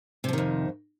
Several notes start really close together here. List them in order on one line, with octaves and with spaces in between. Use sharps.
C3 F3 D#3 F2